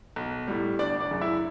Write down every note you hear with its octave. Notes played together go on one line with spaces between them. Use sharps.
B1
A2 G3
G1 D4 D5
D4 D5
F#2 C#3
E4 E5